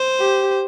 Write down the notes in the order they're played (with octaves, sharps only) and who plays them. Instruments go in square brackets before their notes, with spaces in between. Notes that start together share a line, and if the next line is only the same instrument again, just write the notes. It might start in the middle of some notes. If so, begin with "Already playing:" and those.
Already playing: [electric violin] C5
[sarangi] G4